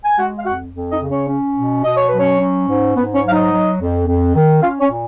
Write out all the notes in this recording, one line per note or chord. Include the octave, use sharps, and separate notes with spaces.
G#5
G#3 F#4 F#5
F5
F2 F#4 F#5
F2
D#4 D#5
C#3
C#4 C#5
C#4
B2
B2 D#5
C#5
F#3 B4
C#4 C#5
C#4
G#2
G#2 B3 B4
C#4 C#5
F#3
F5
D#4 D#5
F#3
F2
F2
D#3
C#4 F4 F5
C#4 C#5
A#2